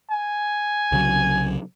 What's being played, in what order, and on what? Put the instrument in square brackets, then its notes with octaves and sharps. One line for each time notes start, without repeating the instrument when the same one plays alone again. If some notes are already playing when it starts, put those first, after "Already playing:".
[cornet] G#5
[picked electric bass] C2 C#3 F#3